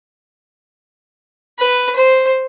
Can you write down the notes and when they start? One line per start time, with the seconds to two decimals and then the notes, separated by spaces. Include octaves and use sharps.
1.59 B4
1.96 C5